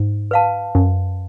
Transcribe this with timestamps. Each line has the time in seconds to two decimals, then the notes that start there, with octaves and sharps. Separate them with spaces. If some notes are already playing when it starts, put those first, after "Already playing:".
Already playing: G#2
0.31 B4 F5 A5
0.75 F#2